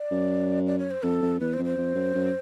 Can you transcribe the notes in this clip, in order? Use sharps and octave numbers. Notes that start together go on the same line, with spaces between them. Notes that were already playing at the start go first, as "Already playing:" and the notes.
Already playing: D5
F#2
D5
C#5
C5
F2 A4
F2
E2 B4
C5
F2
C5
F2
F#2
F#2